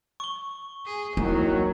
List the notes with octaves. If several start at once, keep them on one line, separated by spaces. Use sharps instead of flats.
C#6 G7
G#4
D#2 D#3 F#3 E4